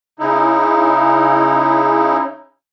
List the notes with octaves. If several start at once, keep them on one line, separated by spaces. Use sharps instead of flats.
C#3 D#4 E4